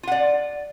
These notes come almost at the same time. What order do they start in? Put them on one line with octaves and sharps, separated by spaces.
F4 F#5 D5